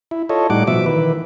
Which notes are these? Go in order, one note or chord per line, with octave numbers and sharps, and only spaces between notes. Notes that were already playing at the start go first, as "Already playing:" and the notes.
E4
F4 A4 C#5 D#5
A2 G3 D#4 F#5 D6
B2 F3 E5 D6
D#3 E3 B4